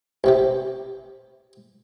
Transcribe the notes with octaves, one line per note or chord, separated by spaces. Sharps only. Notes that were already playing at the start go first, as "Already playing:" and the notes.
A1 C3 G4